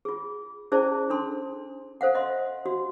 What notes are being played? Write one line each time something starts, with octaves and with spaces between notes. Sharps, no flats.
F4 G#4
C#4 E4 G#4 C5 D5 A5
D4 A4 C6
A4 C5 F5 F#5
D#5 E5 C6
F#4